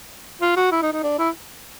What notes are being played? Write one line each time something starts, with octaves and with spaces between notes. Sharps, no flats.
F4
F#4
E4
D#4
D#4
D4
E4